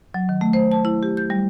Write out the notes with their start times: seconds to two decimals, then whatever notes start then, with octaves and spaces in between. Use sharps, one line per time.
0.14 F#3
0.29 D#3
0.41 A3
0.53 C5
0.72 A5
0.85 E4
1.03 G4
1.17 G6
1.30 G3